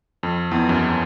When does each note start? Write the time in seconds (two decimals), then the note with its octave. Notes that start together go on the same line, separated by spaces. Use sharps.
0.23 F2
0.51 E2
0.58 F2
0.69 F#2